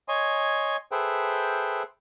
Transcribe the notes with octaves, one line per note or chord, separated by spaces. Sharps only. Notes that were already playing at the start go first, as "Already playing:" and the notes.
C#5 D#5 G#5 C6
G#4 A4 B4 C5 E5 G5